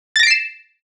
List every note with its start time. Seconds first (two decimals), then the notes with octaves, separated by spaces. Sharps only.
0.16 A6
0.19 A#6
0.23 D7
0.27 C7
0.31 E7